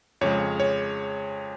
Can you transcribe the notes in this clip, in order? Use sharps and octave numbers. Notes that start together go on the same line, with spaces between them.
F2 C#3 G#3 C#5
C#5